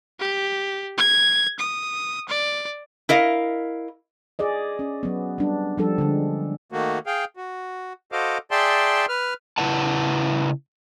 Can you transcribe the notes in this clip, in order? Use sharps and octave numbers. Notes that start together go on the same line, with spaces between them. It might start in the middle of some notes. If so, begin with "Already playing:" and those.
G4
G#6
D#6
D5
E4 A#4 D#5 F5
G#4 D5 D#5
C#4
F#3 B3
G3 D4
F3 G3 D4 A4
D3 G#3
D#3 A3 A#3 F#4
G#4 F5 G5
F#4
F#4 A4 C5 D#5 F5 D6
G#4 D5 E5 G5 A5 C6
B4 F6
C#3 E4 B4 F#5 A5